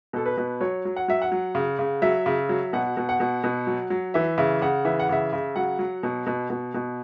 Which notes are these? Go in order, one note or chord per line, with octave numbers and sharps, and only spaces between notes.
B2 A4
B4
B2
F#3 C#5
F#3
F#5
F#3 E5
F#5
F#3
C#3
C#3
F#3 E5
C#3
F#3
B2 F#5
B2
F#5
B2
B2
F#3
F#3
E3 E5
C#3 E5
C#3 F#5
E3 E5
F#5
C#3 E5
C#3
F#3 F#5
F#3
B2
B2
B2
B2